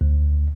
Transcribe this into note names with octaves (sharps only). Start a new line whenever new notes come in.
D2